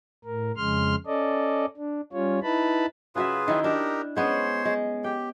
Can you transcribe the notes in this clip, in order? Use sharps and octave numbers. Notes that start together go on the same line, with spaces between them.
A2 A#4
F2 C#3 G#3 C6 F6
C#4 A4 D5 D#5
D4
G3 C#4 F4 C#5
D#4 E4 B4 A5 B5
C#3 F4 F#4 G#4 B4 E5
D#3 E4 G5
D4 D#4 G4 A#4
G#3 B3 C#4 C5 C#5 C6
G#3
G4 G5